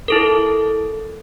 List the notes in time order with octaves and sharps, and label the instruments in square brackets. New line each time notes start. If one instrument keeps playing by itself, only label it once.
[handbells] E4 A4 A#4